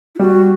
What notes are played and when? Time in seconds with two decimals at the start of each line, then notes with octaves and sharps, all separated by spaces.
0.15 E4
0.19 G3 F#4